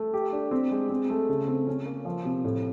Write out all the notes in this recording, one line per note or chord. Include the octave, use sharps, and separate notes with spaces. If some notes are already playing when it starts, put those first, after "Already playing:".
Already playing: A3
G4
D4
C4
G#3
C4
A3
C#3
C4
C#4
A#3
F3
C3
A2